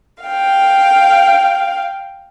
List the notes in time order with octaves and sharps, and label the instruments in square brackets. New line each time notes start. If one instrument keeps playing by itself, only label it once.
[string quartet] F5 G5